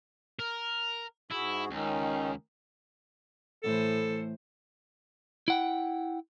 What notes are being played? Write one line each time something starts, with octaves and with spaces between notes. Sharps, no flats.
A#4
G#2 E4 F#4 G#4
C#2 D#3 C#4 D#4
A2 E3 A4 C5
E4 F#5 G5